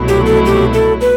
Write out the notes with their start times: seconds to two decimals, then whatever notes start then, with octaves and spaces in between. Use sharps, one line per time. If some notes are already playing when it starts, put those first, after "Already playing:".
Already playing: C2 B2 F#3 A3 E4
0.08 G4
0.26 A4
0.46 G4
0.73 A4
1.01 B4